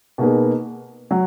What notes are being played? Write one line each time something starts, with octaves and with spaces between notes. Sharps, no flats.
B2 A#3 D#4 G#4 B4
F#3